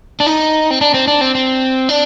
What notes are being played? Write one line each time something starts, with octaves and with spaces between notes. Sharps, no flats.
D4
D#4
C4
D4
C4
D4
C4
C4
D4